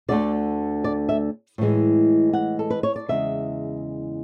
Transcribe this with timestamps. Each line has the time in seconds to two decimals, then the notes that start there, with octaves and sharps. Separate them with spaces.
0.08 D2 D3 A3 D5
0.84 D5
1.09 E5
1.58 A2 E3 G#3
2.33 F#5
2.59 A4
2.70 B4
2.83 C#5
2.96 D5
3.08 E2 C#3 G#3 E5